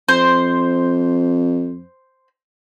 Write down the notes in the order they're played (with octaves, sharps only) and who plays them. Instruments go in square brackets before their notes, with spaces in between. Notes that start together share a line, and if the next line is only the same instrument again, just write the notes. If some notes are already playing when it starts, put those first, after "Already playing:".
[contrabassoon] F2 [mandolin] C5